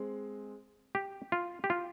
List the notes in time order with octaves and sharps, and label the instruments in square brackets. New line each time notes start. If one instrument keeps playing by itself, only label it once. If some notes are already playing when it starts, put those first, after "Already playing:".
Already playing: [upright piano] G#3 C4
[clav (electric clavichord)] G4
F4
G4
F4